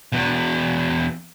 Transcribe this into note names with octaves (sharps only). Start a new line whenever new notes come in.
E2 B2